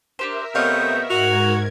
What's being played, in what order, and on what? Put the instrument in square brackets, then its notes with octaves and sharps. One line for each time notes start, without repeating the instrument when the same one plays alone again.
[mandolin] D4 G4 C5 [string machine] A#4 E5
[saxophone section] C3 A3 B3 [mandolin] C#5 D#5 F5 [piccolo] G6
[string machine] G#2 A#4 G#6 [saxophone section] F#4 [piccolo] F7